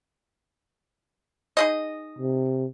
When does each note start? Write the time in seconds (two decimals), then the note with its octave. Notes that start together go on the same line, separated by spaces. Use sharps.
1.57 D#4 G#4 D#5
2.19 C3